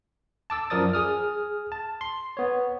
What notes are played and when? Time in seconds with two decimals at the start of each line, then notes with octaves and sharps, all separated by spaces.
0.50 A5 D6 E6
0.70 F#2 F3 A#4 D5 D#6 A6
0.93 G#4 D#6 F6
1.72 A5
2.01 C6
2.37 B3 C#5